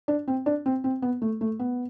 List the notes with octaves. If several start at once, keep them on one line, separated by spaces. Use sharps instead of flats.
D4
C4
D4
C4
C4
B3
A3
A3
B3